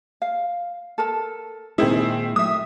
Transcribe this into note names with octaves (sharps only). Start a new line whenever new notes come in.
F5
A4 A#4 A5
A#2 D#3 G#3 C4 E4 G#4
F#3 A3 E5 D#6